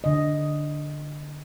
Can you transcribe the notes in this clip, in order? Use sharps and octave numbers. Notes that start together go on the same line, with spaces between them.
D3 D#5